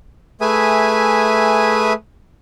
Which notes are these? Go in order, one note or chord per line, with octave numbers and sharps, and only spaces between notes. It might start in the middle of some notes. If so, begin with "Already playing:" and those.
A3 G#4 B4 E5 G#5 D#6